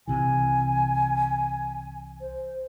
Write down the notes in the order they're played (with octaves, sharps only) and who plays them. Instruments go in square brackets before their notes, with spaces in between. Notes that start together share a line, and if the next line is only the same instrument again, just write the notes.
[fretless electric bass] C2 C3 E3 [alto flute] G#5
[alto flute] C5